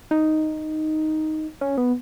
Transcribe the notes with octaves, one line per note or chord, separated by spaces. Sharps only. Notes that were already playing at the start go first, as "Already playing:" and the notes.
D#4
C#4
B3